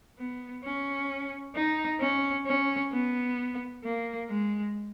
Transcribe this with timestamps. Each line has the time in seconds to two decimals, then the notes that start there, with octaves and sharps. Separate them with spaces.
0.19 B3
0.64 C#4
1.55 D#4
2.01 C#4
2.47 C#4
2.92 B3
3.84 A#3
4.30 G#3